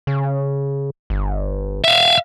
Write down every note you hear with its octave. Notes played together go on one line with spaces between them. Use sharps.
C#3
G1
E5 F5